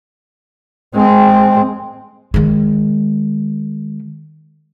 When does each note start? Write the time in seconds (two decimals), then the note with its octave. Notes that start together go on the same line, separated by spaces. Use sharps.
0.95 G#3 C4
2.34 D#3 G#3